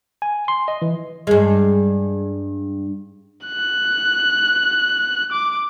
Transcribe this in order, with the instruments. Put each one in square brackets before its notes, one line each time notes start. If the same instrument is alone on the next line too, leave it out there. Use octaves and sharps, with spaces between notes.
[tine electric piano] G#5
C6
D#5
E3
[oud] G2 G#3
[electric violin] F#6
D6